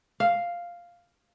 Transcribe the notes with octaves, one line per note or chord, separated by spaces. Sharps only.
F5